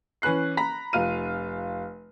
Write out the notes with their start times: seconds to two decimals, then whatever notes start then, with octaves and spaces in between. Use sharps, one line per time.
0.22 E3 C#4 B4 F#6 C7
0.57 A#5 B5 B6
0.93 F1 F4 F6 D#7